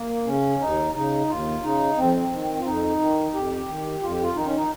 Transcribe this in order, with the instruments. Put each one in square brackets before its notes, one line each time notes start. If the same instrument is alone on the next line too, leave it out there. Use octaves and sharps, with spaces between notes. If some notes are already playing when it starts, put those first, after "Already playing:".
Already playing: [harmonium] A#3
C#3 C#4
D#2 D#4
C#3 D#4
D#2 F4
C#3 D#4
F2 C4
D#3
F4
F2 D#4
D#3
F2 G4
D#3
F2 F4
G4
F4
D#3 D#4
C#4
D#4